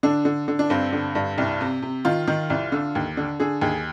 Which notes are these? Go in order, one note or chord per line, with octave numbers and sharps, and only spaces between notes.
D3 D4
D3
D3
D4
G2 C4
D3
G2
C2
C3
C3
D#3 F4
D#3
C2
D3
D#2
D3
D3 G#4
D#2 G#4